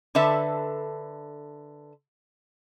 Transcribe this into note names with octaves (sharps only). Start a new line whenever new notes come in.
D3 A4 B4 E5